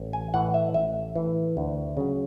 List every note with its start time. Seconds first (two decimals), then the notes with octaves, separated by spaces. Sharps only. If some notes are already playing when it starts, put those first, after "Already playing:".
Already playing: A1
0.13 G#5
0.34 A2 E3 F#5
0.54 E5
0.74 A1 E5
1.16 A2 E3
1.57 D2
1.97 C#3 F#3